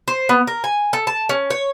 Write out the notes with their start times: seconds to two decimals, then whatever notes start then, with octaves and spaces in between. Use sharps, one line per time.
0.08 C5
0.29 B3
0.47 A#4
0.64 G#5
0.93 A4
1.07 A5
1.29 C#4
1.50 C#5